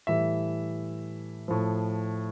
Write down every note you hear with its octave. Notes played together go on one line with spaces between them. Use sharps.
A2 E3 G3 E5
A2 F3